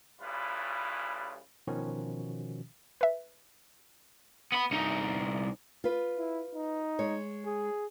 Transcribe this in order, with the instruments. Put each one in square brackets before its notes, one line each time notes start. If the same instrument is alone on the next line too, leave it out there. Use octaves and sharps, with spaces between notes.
[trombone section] A1 C#3 G3 E4 F4 B4
[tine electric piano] B2 D#3 F3 C#4 F#4
[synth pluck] B4 E5
[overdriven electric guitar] B3 B5
C2 D#4
[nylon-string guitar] F4 B4
[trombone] E4
D#4
[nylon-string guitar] G#3 C#5
[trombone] G#4